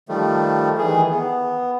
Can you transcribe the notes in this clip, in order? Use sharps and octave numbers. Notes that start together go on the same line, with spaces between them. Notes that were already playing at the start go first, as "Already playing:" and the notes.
D#3 F3 G3 A3
D#3 E3 G#4
B3